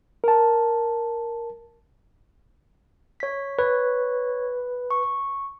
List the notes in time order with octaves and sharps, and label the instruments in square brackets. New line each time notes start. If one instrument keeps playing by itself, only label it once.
[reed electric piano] A#4 A5
[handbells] C#5 B6
[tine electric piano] B4 [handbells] C#5
[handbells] C#6